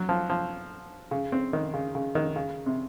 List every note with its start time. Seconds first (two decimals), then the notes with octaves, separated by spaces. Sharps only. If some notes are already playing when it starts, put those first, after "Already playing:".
Already playing: F#3
0.09 F3
0.30 F3
1.11 C#3
1.32 C4
1.53 D#3
1.74 C#3
1.95 C#3
2.15 D#3
2.36 C#3
2.66 C3